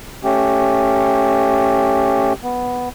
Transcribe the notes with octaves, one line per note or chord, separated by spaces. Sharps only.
A3 C#4 G4
B3